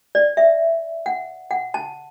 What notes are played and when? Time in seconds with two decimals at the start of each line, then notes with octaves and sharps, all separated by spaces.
0.15 D5
0.37 E5
1.06 F#5
1.51 F#5
1.74 A5